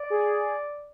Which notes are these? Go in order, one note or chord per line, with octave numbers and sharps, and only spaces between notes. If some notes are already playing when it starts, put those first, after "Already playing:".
Already playing: D5
G#4